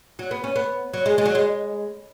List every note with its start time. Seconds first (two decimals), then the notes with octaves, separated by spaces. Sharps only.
0.19 F#3
0.31 B3
0.44 C#4
0.56 B3
0.94 F#3
1.06 G#3
1.18 G#3
1.25 F#3
1.35 G#3